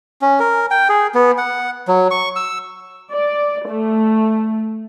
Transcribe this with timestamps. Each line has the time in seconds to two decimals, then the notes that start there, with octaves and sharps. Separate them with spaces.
0.22 C#4
0.40 A#4
0.71 G5
0.89 G#4
1.15 B3
1.38 F#5
1.88 F#3
2.11 C#6
2.36 E6
3.12 D5
3.68 A3